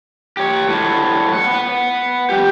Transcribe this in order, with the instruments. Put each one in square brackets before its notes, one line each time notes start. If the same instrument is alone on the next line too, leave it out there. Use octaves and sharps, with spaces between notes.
[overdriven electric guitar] G4 C#5
A2 F#3
B3 F#5
F#3 G4